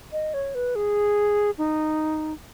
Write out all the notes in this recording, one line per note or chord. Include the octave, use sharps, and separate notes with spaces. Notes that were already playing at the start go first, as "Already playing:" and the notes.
D#5
C#5
B4
G#4
D#4